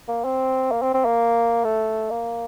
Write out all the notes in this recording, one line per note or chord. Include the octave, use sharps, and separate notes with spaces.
A#3
C4
A#3
C4
C4
A#3
A3
A#3